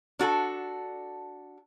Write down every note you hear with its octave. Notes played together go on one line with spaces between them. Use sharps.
D4 F#4 G#4 A4